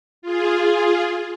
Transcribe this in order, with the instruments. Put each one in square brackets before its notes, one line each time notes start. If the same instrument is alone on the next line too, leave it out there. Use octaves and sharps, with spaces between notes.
[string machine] F4 G#4